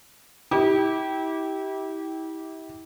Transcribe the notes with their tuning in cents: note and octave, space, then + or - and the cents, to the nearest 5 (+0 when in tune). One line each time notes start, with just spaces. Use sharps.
E4 -35 G4 -10